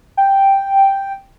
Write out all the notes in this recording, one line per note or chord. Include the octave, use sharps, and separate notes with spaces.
G5